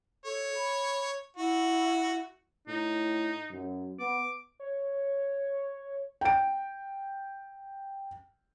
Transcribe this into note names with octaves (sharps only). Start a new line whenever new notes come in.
A4 C#5
B5
E4 F#4
A2 D#4
F#2
B3 D6
C#5
G5 D7